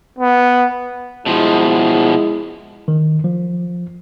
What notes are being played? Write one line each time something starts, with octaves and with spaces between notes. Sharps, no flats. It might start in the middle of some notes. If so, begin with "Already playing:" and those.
B3
B2 F3 G#3 E4
D#3
F3